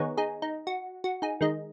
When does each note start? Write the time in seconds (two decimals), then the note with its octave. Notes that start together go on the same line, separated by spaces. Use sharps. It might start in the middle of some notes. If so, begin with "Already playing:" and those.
Already playing: D#3 B3 D#4 G#4 C#5
0.17 D#4 G#4
0.42 D#4
0.67 F#4
1.04 F#4
1.22 D#4 G#4
1.41 D#3 G#3 D#4